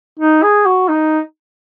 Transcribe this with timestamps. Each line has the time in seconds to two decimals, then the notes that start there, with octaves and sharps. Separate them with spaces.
0.20 D#4
0.43 G#4
0.66 F#4
0.89 D#4